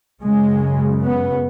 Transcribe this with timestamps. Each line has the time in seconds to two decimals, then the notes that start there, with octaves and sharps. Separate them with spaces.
0.23 F#2 C#3 G#3
1.03 B3